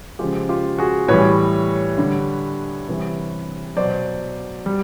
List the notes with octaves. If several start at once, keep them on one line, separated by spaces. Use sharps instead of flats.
C#3 F3 G#3 F4 G4
F4 G4
F#4 G#4
A2 E3 G3 B4 C#5
D3 G3
C3 E3 G3
B2 F#3 C5 D5
G3